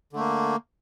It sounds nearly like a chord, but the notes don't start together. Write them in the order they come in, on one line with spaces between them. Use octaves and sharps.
D3 A3 A#3